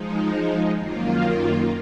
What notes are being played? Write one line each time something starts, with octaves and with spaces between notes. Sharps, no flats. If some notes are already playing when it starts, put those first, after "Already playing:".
Already playing: F3 G#3 D#4
F#2 D#3 A#3 F4